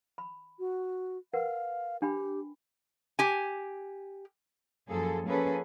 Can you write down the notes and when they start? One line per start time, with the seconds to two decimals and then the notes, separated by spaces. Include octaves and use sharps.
0.18 B5
0.59 F#4
1.33 A#4 B4 F5 F#5
2.02 D4 G4 G5 B5
3.19 G4 G#5
4.89 F#2 F3 A#3 G#4 A4
5.25 F3 A#3 C#4 G#4 A4 B4